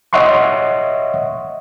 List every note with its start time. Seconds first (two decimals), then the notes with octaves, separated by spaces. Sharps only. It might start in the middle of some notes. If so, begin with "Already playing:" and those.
0.13 C#5 D#5 E5 F#5 C6 C#6